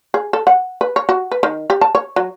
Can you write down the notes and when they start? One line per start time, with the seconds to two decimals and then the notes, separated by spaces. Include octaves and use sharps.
0.14 G#4
0.33 A4
0.47 F#5
0.81 B4
0.96 C#5
1.09 F#4
1.32 B4
1.43 D#3
1.70 G4
1.81 A5
1.95 C#5
2.16 F#3